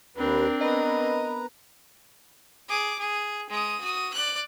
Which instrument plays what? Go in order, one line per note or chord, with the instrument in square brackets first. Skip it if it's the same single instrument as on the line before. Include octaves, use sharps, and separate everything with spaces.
[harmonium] D#2 B4 [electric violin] C4 D4 [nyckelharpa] A#4
[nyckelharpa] B3 A#4 [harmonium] B4 A#5 [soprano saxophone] D#5
[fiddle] G#4 D6
G#4
G#3 D#6
F#4 D#6
D5 F#6